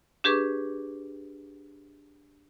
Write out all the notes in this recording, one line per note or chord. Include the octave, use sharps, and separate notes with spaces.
D4 G4 G#4 B4 C#6 D6